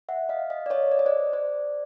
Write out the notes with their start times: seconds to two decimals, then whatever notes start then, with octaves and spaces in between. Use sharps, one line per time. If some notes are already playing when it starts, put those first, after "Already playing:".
0.09 E5 F#5
0.29 D#5 F5
0.50 D#5 F5
0.66 D5
0.70 C#5 D#5
0.92 D5
0.99 D#5
1.06 C5 D5
1.33 C5 D5